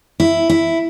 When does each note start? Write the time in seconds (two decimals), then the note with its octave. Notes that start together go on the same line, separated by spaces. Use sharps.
0.20 E4
0.50 E4